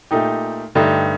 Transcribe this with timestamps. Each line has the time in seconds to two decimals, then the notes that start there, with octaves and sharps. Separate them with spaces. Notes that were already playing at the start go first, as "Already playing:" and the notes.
0.11 A#2 A3 D#4 G4
0.75 G2 D3 A3 D#4 G4